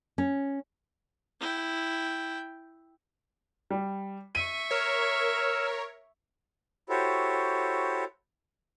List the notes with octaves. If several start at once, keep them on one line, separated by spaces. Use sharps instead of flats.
C#4
E4 G5
G3
E5 C#6 D#7
A#4 C#5 E6 F6
E4 F#4 G4 A4 C5 C#5